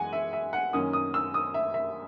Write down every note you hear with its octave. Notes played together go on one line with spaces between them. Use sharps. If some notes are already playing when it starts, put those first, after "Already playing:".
Already playing: F#2 E3 G#3 F#5 G#5
E5
E5
F#5
F#2 D#3 A#3 C#4 D#6
D#6
E6
D#6
E5
E5